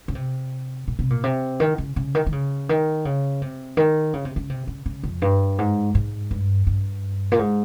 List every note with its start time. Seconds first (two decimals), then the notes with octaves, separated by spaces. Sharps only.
0.08 C#3
0.15 C3
0.88 A#2
0.99 C3
1.10 A#2
1.24 C3
1.60 D#3
1.78 C#3
1.96 C#3
2.15 D#3
2.26 D#3
2.32 C#3
2.69 D#3
3.05 C#3
3.42 C3
3.77 D#3
4.13 C#3
4.25 C3
4.36 C#3
4.50 C3
4.67 C#3
4.86 C#3
5.03 F2
5.22 G2
5.59 G#2
5.95 G#2
6.31 G2
6.67 G2
7.32 A#2
7.39 G#2